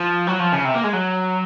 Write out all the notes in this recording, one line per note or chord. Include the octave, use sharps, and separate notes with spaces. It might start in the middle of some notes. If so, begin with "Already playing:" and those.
Already playing: F3
F#3
F3
C#3
C3
A#3
G#3
F#3